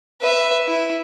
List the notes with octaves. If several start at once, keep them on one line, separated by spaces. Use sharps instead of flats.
B4 E5
E4